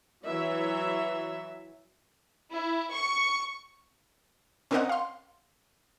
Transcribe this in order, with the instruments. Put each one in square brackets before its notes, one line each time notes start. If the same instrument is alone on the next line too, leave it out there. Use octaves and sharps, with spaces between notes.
[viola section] E3 F#3 E5
[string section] E4
C#6
[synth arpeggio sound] C4 C#4 A#4 D5 D#5 F#5
F5 C6